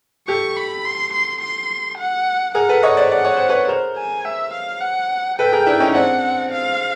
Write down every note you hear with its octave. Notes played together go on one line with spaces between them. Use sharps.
G4 A4 C#6
B5
C6
C6
C6
F#5
G#4 A#4 F#5
A4 B4
C#5 D#5
C5 D5
D5 F#5
C#5
C5
B4 C#5
A#4 C5
G#5
E5
F5
F#5
A4 B4 G5
G#4 A#4
D4 E4
C#4 D#4
C4 D4 F#5
F5